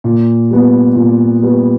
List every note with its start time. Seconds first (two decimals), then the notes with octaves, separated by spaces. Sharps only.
0.04 A#2
0.50 G3 B3
0.95 A#2
1.42 G3 B3